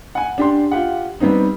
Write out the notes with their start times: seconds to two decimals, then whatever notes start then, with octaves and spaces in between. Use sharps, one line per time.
0.15 F#5 G#5
0.38 D4 G4 C6
0.71 F4 G4 F#5
1.20 G3 B3 C4 D#4